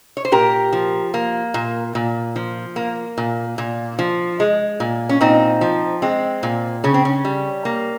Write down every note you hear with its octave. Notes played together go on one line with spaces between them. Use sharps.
C#5
C5
A#2 G4 A#4
F3
A#3
A#2
A#2
F3
A#3
A#2
A#2
F3
G#3
A#2
C#4
A#2 C4 D#4
F3
G#3 C4
A#2
C#3 C#4
C4
C#4
G3
A#3